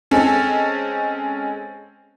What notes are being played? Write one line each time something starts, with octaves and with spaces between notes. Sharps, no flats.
G#3 C4 C#4 A4